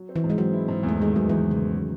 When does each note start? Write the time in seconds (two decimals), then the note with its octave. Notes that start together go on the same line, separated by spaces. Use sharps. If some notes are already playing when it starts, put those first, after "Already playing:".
Already playing: F#3
0.09 C4
0.16 E3
0.24 G#2
0.30 G#3
0.38 F#3 C4
0.53 E4
0.68 G#2
0.83 E2
0.89 A3
0.99 D#3 G#3
1.13 E2 F#3
1.29 E2 E3
1.44 G#3
1.51 C#3
1.59 D#3
1.75 F#3